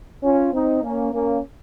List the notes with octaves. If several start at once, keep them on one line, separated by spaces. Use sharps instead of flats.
C#4 F4
C4 D#4
A#3 C#4
A#3 C#4